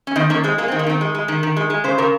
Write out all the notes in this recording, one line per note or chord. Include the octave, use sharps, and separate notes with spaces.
C#4
D#3 C4 D#4
D#3 A#3 C#4
G#3 C4
G#3 A#3
C4
D#3
A#3
D#3 C4
G#3
G#3
D#3
D#3
G#3
G#3
C#3 C5
C#3 A#4